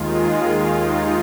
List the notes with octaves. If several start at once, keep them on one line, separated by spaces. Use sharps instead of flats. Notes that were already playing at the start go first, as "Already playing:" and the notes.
Already playing: D#2 D#3 G#3 F4
G#4
D#2 D#3 G#3 F4
D#4